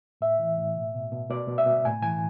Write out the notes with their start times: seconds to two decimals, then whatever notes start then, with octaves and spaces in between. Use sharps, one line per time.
0.21 A2 E5
0.39 E3
0.57 A2
0.76 B2
0.95 B2
1.12 B2
1.30 B2 D5
1.48 B2
1.58 E5
1.66 B2
1.85 A2 G#5
2.03 E3 G#5